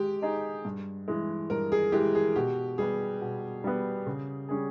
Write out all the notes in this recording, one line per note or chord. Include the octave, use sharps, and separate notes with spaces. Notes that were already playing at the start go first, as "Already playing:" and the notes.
Already playing: G#3 G4
D#4 G#4 D#5
G2
E3 G#3
G2 A#4
G#4
E3 G#3 G4
G#4
B2 G4
G3 B3 G#4
B2
G3 B3
C#3
G3 C#4 G#4